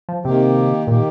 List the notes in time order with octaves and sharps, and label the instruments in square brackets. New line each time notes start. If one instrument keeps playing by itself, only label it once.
[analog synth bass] F3
[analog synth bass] C3 [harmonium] D#3 A#3 G4
[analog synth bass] A#2 [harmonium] D#3 A#3 G4